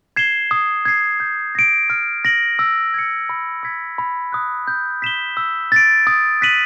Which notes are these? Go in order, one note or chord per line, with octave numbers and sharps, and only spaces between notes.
G#6 C7 E7 G7
D#6
G#6 C7
G6
A#6 D7
F6
A#6 D7 F#7
E6
G#6 C#7
B5
E6 G#6 B6
B5
D#6 F#6
G6
B6 E7 G7
E6
A6 D7
D#6
F#6 B6 D#7 F#7